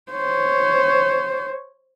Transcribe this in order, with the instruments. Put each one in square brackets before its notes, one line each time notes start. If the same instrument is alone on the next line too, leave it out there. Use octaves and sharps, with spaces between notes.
[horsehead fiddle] C5 C#5